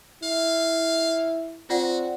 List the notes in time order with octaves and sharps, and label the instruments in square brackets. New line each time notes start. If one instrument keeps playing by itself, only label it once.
[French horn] E4 [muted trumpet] F5
[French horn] C4 [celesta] F4 D5 F#5 [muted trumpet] F#4